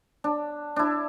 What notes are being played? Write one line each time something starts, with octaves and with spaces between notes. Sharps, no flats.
D4
D4 E4